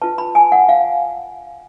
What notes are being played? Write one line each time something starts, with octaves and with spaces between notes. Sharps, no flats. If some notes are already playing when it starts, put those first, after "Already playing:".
F4 B4 A5
B5
G#5
F#5
F5